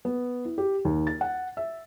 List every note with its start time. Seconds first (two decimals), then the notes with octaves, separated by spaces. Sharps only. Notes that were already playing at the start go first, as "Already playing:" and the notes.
0.05 B3
0.45 E4
0.58 G4
0.85 D#2
1.07 A6
1.21 F#5
1.57 E5